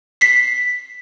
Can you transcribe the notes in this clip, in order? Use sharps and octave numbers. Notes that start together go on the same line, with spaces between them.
B6 C7